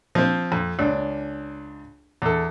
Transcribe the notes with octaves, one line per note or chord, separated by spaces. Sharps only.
F3 C4
F2
C#2 D4
E2 A4